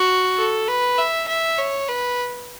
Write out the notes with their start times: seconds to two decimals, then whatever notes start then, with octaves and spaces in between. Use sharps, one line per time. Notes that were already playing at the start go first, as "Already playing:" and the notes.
Already playing: F#4
0.37 A4
0.68 B4
0.98 E5
1.28 E5
1.58 C#5
1.88 B4